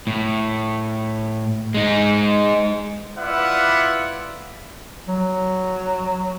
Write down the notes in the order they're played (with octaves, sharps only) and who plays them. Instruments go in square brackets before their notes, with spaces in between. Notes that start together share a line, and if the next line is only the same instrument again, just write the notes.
[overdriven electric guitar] A2
G#3 D#4
[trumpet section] E4 F4 B4 D5 E5 F#5
[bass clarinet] F#3